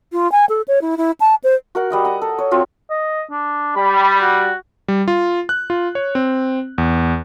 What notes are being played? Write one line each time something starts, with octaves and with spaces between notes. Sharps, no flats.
F4
G#5
A4
C#5
E4
E4
A5
C5
F#4 A#4 F#5
G3 D#5 F#5
F#5 A#5
A4
C#5
C4 F4 F#4
D#5
D4
G3 B5
F#4
G3
F4
F#6
F4
C#5
C4
E2